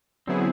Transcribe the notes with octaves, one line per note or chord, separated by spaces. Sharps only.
D3 F#3 B3 C4 E4 G#4